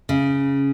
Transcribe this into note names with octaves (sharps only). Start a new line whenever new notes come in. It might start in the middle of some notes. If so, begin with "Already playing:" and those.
C#3